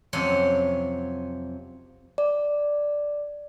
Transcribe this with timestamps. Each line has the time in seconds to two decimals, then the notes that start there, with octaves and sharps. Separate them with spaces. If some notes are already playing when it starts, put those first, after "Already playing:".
0.13 F2 C3 F#3 C#4 C#5 C6
2.18 D5